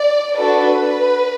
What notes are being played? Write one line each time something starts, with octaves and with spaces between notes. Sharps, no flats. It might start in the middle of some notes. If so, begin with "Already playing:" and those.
Already playing: D5
D4 F#4 A4 B4